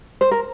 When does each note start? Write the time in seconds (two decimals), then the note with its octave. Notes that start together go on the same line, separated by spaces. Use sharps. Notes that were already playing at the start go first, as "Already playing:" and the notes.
0.21 C5
0.31 A#4